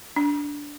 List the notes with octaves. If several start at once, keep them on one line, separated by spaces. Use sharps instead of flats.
D4